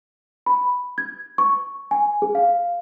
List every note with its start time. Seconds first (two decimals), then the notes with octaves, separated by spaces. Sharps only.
0.46 B5
0.98 G#6
1.38 C#6
1.91 G#5
2.22 G#4
2.35 F5